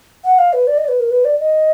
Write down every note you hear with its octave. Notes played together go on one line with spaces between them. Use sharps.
F#5
F5
B4
D5
D#5
D5
B4
A#4
B4
D5
D#5